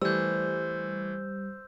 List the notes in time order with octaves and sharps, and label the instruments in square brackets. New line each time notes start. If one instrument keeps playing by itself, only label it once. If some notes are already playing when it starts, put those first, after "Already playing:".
[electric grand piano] E3 A3 [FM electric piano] G3 [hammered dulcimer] C5 [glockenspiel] E6 G6